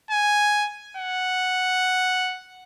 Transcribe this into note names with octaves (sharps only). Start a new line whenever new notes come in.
G#5
F#5